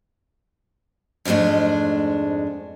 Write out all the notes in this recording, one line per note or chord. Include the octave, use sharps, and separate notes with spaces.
F2 G#2 G#3 A3 D4